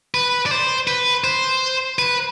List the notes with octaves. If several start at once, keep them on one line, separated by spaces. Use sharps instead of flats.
B4
D5
C5
B4
C5
B4